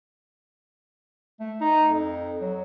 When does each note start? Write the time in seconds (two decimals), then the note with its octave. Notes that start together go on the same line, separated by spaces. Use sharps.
1.40 A3
1.61 D#4
1.91 F2
2.41 F#3